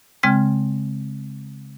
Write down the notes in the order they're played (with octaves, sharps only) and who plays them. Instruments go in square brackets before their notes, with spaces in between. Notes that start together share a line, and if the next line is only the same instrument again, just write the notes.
[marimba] C#3 G#3 C4 G5 F6 G#6